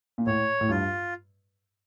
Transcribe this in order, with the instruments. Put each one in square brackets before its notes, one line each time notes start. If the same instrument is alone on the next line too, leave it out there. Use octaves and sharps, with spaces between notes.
[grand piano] A#2
[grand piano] A2 [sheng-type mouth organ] C#5
[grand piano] A2
[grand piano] G2 [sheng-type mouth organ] F4